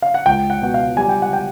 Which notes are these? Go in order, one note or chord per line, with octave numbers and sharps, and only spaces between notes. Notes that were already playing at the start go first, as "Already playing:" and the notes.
F5
F#5
C#2 G5
F#5
B2 F#5
F5
G3 G#5
G5
F#5
G5